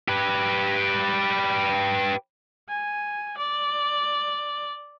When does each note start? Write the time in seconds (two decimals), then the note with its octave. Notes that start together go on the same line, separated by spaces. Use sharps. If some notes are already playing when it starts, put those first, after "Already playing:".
0.08 G4 B4
2.69 G#5
3.38 D5